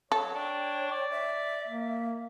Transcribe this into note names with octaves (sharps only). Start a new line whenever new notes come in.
F#3 A4 C#5
D4 G5
D5
E5
A#3